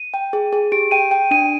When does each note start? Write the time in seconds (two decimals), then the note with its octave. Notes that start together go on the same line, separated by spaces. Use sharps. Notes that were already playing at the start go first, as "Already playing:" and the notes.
Already playing: D#7
0.14 G5
0.33 G#4
0.53 G#4
0.72 G4 D7
0.91 G5 D#7
1.11 G5
1.31 D4 D#7